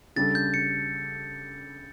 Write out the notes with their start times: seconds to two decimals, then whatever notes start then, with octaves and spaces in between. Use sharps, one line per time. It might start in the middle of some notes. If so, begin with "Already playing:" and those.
0.16 C#3 G3 D4 A4 A6
0.35 G6
0.54 C#7